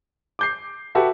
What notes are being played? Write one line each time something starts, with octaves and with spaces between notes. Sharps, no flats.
D6 G6 C7
F#4 G4 A4 B4 E5 F#5